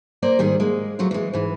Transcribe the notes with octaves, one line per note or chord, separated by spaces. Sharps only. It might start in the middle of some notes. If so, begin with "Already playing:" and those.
A#3 C5 D5 D#5
G#2 D#3 G3 G#4
G#3 A#3
F#3 A3 F4
E3 G#3
G#2 E3